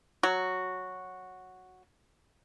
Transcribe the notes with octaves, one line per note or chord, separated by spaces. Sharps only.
F#3 F#4